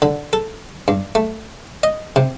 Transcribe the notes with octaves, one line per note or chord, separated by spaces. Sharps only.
D3
A4
G2
A3
D#5
C3